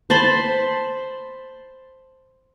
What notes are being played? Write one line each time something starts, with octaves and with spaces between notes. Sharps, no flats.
C5 A5 B5 C6